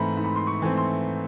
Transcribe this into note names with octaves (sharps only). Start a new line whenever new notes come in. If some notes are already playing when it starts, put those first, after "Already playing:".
Already playing: G#2 E3 A3 C4 A#5 B5
G#2
B5
C6
C#6
E3 A3 C4
C6